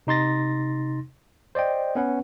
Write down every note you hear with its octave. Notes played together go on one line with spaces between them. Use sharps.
C3 D#4 C6 A6 A#6
C5 D5 D#5 G5
B3 C#4 B4 F#5